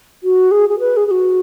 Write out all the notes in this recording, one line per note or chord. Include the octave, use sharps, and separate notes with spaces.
F#4
G#4
G#4
B4
G#4
G#4
F#4